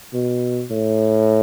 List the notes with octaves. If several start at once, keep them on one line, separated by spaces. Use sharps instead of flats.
B2
A2